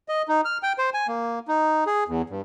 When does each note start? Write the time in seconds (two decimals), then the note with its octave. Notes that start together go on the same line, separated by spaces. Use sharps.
0.08 D#5
0.28 D#4
0.45 F6
0.63 G5
0.78 C5
0.94 G#5
1.08 A#3
1.48 D#4
1.87 G#4
2.08 E2
2.30 G2